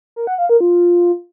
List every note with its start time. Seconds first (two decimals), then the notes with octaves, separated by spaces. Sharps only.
0.16 A#4
0.27 F#5
0.38 F5
0.49 A#4
0.60 F4